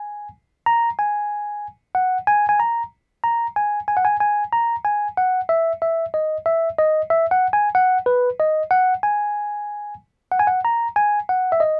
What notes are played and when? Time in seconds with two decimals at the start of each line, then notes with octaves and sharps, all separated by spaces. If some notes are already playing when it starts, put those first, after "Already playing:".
Already playing: G#5
0.66 A#5
0.99 G#5
1.95 F#5
2.27 G#5
2.49 G#5
2.60 A#5
3.24 A#5
3.56 G#5
3.88 G#5
3.97 F#5
4.05 G#5
4.20 G#5
4.52 A#5
4.85 G#5
5.17 F#5
5.49 E5
5.82 E5
6.14 D#5
6.46 E5
6.78 D#5
7.10 E5
7.31 F#5
7.53 G#5
7.75 F#5
8.06 B4
8.39 D#5
8.71 F#5
9.03 G#5
10.31 F#5
10.39 G#5
10.47 F#5
10.65 A#5
10.96 G#5
11.29 F#5
11.52 E5
11.60 D#5